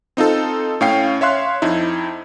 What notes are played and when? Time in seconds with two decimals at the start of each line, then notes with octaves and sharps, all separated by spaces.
0.17 C4 D#4 F4 A4
0.81 A2 C#4 F5 G5 C7
1.21 C#5 E5 F5 C6 F#6
1.62 F2 D#4 E4